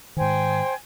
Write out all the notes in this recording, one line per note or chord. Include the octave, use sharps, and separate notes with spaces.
G#2 D#3 C5 G5 G#5